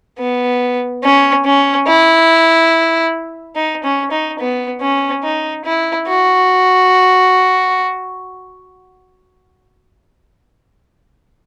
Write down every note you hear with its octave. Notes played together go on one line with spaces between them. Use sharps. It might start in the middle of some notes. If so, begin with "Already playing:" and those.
B3
C#4
C#4
E4
D#4
C#4
D#4
B3
C#4
D#4
E4
F#4